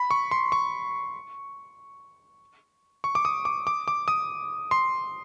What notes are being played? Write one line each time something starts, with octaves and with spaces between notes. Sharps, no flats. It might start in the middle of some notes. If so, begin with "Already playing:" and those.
Already playing: B5
C#6
C6
C#6
C#6
D6
D#6
D6
D6
D6
D#6
C6